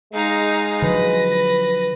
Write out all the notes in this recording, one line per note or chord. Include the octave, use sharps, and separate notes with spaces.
G#3 D#4 F5 A#5
D3 F3 F#3 B4 A#6